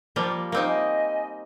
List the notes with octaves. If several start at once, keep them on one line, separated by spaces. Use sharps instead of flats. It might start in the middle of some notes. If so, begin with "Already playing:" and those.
F3 G3 A#3
A#3 C4 D#4
D#5 G#5